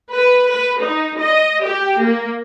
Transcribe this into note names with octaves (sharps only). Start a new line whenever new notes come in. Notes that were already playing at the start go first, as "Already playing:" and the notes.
B4
B4
D#4
D#5
G4
A#3